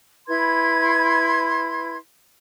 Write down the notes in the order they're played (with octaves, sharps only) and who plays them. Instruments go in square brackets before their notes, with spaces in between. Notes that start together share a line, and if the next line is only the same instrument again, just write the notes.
[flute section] E4 B4 C6 G#6